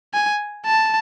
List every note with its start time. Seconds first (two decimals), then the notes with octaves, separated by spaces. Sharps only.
0.14 G#5
0.66 A5